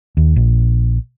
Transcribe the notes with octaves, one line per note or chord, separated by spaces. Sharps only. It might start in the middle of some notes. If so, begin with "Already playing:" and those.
D#2
A#1